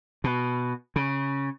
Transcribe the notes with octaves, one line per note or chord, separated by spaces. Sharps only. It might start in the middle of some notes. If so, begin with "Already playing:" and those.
B2
C#3